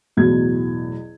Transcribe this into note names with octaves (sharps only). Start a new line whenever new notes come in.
A1 E2 B2 F#3 G#6